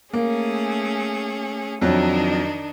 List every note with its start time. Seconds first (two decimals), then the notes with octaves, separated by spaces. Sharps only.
0.13 A3 A#3 C#4 G#4
1.81 F2 D#3 F#3 D4 D#4